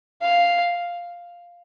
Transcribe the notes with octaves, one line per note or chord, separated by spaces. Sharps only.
F5